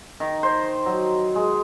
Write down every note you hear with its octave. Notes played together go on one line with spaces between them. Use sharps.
D#3
C5
F#3
G#3